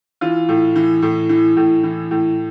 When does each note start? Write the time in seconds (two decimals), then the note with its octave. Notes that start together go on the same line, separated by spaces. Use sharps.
0.21 E3 F4
0.49 A2
0.76 E3
1.02 A2
1.29 E3
1.57 A2
1.83 E3
2.11 A2